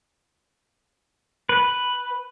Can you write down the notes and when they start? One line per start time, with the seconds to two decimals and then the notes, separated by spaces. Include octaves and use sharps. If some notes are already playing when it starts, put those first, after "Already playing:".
1.49 B4